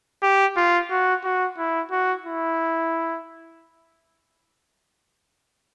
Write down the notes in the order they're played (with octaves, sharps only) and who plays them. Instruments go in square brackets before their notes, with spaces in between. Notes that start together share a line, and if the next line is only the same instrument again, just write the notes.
[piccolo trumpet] G4
F4
F#4
F#4
E4
F#4
E4